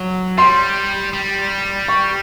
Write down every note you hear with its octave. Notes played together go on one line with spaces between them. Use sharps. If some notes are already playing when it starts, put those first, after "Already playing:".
Already playing: F#3
G3 C6
G3
C#6